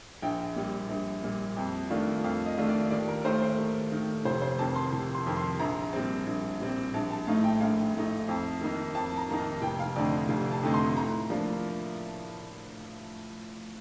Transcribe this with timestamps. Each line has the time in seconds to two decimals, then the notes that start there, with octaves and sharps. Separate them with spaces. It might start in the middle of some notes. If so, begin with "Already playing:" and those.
0.22 A#1 G5
0.56 A#2 G3
0.90 A#1
1.23 A#2 G3
1.57 F2
1.90 D#3 A3 D4 F4
2.24 F2 F5
2.46 D#5
2.58 D#3 A3 D4 F4
2.69 D5
2.90 D#2 D5
3.08 A#4
3.24 D#3 A3 C5
3.42 C5
3.58 D#2
3.92 D#3 A3
4.25 F1 C5
4.42 C5
4.59 F2 D#3 A5
4.76 C6
4.92 F1
5.15 C6
5.26 F2 D#3
5.37 C6
5.59 A#1 A#5
5.93 A#2 G3 C4
6.26 A#1
6.60 A#2 G3 C4
6.94 A#1 A5
7.11 A5
7.27 A2 A3 D#4 F5
7.44 G5
7.60 A#1 F5
7.95 A2 A3 D#4
8.28 F2
8.61 D#3 A#3 D#4
8.95 F2 A5
9.17 A#5
9.29 D#3 A#3 D#4
9.40 A5
9.62 F1 G5
9.79 F5
9.96 F2 D3 A3 D#4 D5
10.29 F1 F5
10.51 A5
10.63 F2 D3 A3 D#4
10.74 C6
10.96 A2 A#5
11.30 F3 A#3 D4 F4